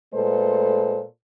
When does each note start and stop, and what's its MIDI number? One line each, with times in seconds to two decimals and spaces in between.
0.14 1.03 46
0.14 1.03 56
0.14 1.03 57
0.14 1.03 69
0.14 1.03 71
0.14 1.03 72